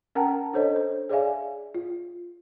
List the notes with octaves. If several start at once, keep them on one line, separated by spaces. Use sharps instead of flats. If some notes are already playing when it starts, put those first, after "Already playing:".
C#4 A#4 F#5 G5 A5 A#5
D4 A4 C5 C#5 D#5
C5
G#4 C#5 D5 E5 F5 G#5
F4